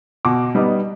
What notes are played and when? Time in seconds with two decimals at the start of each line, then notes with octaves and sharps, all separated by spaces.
0.25 B2 D6
0.55 G3 B3 D#4